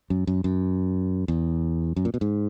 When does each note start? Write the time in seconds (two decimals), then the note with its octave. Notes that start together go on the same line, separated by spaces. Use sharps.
0.10 F#2
0.27 F#2
0.44 F#2
1.28 E2
1.96 F#2
2.05 A#2
2.14 B2
2.21 G#2